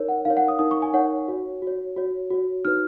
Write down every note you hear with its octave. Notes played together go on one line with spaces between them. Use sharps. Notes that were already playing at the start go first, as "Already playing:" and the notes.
Already playing: D#4 A#4 C#5
F#5
D#4 A#4 C#5 F5
F#5
D#6
D#4 A#4 C#5 D#6
C#6
G#5
D#4 A#4 C#5 F#5
F#4 C#5
F#4
C#5
F#4 C#5
F#4 C#5
D#4 F#4 B4 F6